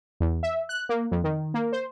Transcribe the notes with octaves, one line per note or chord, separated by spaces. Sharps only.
E2
E5
F#6
A#3
F2
D#3
A#3
C5